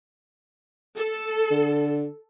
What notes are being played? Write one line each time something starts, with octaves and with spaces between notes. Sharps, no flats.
A4
D3